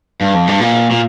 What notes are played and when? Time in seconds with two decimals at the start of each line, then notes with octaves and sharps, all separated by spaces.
0.21 G2
0.34 F2
0.47 G2
0.60 A#2
0.91 A#2